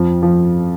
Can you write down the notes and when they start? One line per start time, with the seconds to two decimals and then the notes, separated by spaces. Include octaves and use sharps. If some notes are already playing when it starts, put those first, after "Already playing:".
Already playing: F2 F3
0.23 F3